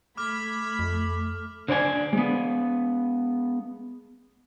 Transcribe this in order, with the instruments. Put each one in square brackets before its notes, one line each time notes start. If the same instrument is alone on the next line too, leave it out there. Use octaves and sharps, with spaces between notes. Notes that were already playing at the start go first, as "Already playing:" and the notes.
[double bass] A3 [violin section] B5 G#6 B6 [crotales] D6 F6
[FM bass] F2
[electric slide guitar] D3 C5 D5 G#5
G#3 B3